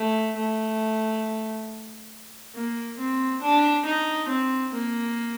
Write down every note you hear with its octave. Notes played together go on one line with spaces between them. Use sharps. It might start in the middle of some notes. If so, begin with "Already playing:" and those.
Already playing: A3
A3
A#3
C4
D4
D#4
C4
A#3